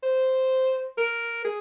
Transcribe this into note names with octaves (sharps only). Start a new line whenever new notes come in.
C5
A#4
G#4